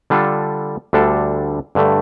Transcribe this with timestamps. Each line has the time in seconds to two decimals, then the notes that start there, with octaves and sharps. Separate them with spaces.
0.10 D3 G3 D4 F4 A4
0.93 D2 D3 G3 D4 A4
1.75 G2 D3 A3